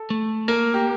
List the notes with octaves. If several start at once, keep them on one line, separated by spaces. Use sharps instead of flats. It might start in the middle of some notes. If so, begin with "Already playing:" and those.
Already playing: A4
A3
A#3 A#4
G4